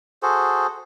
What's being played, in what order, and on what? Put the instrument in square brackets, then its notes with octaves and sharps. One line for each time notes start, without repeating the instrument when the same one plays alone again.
[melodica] F#4 G#4 A4 C5